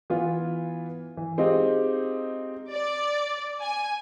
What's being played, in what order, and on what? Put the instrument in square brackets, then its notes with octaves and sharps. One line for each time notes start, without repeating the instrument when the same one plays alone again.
[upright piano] E3 B3 F4
E3
G#3 C4 D#4 F4 G4 D#5
[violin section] D5
G#5